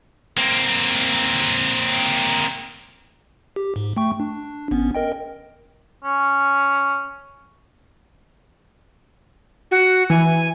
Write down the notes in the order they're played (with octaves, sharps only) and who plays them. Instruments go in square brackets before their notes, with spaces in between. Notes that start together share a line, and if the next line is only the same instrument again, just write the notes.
[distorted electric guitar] A#3 C4
[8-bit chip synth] G4
G#2
A3 G5 C#6
D4
G#1 B3 C#4
A#4 D#5 G5
[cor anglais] C#4
[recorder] F#4
[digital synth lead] E3 [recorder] G#5